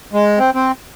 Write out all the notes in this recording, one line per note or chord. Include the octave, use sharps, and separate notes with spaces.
G#3
C4
C4